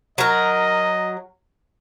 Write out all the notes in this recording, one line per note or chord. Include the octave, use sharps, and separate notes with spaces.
F#3 A#4 D#5